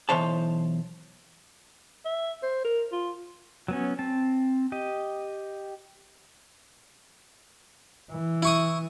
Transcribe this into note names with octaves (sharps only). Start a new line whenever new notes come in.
B1 E3 C5 C#5 A5
E5
C5
A#4
F4
F#3 B3 C#4
C4 A5
G4 D#5
E3
E4 C#6 D#6